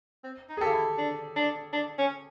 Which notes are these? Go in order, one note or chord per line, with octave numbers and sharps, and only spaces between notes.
C4
D#4
G#4
F4 G4 A4
E4
D4
D4
D4
C#4